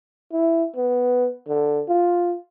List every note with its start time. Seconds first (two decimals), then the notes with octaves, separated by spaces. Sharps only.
0.32 E4
0.76 B3
1.47 D3
1.88 F4